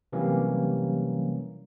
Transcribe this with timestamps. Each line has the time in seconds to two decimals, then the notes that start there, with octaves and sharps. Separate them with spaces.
0.12 C3 E3 F#3 G3 A#3 C#4